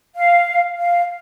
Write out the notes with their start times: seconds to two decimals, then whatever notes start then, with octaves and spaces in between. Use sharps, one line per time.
0.16 F5
0.79 F5